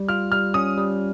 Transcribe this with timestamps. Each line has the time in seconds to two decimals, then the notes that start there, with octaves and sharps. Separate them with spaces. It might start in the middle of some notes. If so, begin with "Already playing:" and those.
Already playing: G3
0.08 F4 F6
0.32 G3 F6
0.54 C#4 D#6
0.78 G3